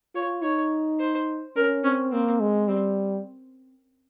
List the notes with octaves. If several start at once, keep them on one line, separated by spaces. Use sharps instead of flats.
F4 C#5
D#4 C#5
C5
C#4 A#4
C4 C#4
A#3 C4
G#3
G3 C4